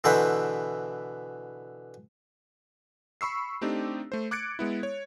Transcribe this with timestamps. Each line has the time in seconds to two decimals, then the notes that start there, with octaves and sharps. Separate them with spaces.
0.04 B2 D3 E3 B4 C5
3.21 B5 C#6 E6 C7
3.61 A3 C4 D4 D#4 G4
4.12 A3 C5
4.31 D6 F#6 G#6 A6 C#7 D7
4.59 G#3 B3 E4
4.83 C#5